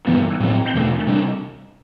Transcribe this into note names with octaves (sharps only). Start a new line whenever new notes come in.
G2 E3 B3
A2 F#3 C4
E2 B2 A3
C3 G3 D4